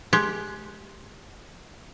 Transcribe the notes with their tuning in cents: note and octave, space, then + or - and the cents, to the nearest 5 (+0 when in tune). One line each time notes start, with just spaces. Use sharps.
G#3 +20 G4 +0